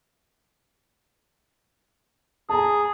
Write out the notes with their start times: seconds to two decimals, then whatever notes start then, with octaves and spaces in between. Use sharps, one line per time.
2.49 G#4 A5 A#5